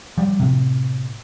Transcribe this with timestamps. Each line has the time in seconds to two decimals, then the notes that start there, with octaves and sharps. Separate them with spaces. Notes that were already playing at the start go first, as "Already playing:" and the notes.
0.18 F3 G3
0.40 A2 C3